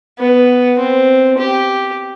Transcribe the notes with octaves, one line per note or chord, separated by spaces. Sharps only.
B3
C4
G4